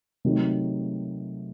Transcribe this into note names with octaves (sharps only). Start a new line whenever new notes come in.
C3 D#3 F#3 A3